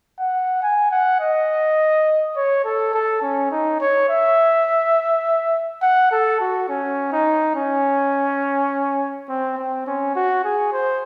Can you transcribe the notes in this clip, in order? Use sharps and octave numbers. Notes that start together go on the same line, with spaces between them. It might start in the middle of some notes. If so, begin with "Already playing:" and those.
F#5
G#5
F#5
D#5
C#5
A4
A4
C#4
D#4
C#5
E5
F#5
A4
F#4
C#4
D#4
C#4
C4
C4
C#4
F#4
G#4
C5